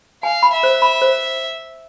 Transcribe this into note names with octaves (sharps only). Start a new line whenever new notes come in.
F5 G#5
B5
E5
C5
B5
C5